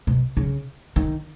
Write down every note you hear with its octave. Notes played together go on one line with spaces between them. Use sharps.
B2
C#3
D#3